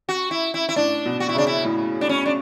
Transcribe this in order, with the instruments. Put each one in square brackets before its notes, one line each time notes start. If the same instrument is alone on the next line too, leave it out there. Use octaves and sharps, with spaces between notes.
[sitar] F#4
E4
E4
E4
[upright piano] A2 [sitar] D4
[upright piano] B2
[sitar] F#4
E4
[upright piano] C#3 [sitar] D4
[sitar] E4
[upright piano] A2
[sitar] D4
C#4
D4